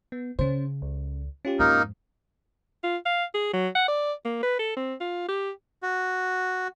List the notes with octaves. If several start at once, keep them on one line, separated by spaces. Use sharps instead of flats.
B3
C#3 C#4 C5
C#2
C#4 F4 G4
F2 G#2 A#3 D#4
F4
F5
G#4
F#3
F#5
D5
A#3
B4
A4
C4
F4
G4
F#4